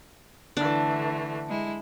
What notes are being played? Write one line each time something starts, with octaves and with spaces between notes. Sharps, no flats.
D3 E3 A3 D4
G#3 E4